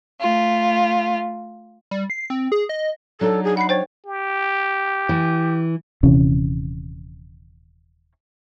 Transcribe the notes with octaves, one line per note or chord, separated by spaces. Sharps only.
A3 F4
G3
C7
C4
G#4
D#5
F#3 D4 D#4 A4
G#4
F#5 B5 C7
C5 C#5 G5 A6
G4
E3
D#1 C3 E3 C#4